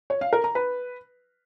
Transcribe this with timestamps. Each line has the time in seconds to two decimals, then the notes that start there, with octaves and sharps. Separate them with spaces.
0.10 C#5
0.21 F5
0.33 A#4
0.44 A#5
0.55 B4